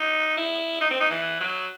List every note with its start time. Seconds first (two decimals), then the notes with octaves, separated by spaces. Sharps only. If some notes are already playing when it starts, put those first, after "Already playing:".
Already playing: D#4
0.37 E4
0.81 D#4
0.91 C4
1.01 D#4
1.10 E3
1.40 F#3